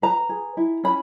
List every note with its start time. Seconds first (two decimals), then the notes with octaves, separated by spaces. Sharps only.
0.02 B4 A#5
0.29 G#4
0.57 E4
0.84 C#4 B5